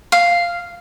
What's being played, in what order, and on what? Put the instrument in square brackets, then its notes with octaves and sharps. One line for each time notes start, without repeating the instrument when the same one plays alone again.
[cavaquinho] F5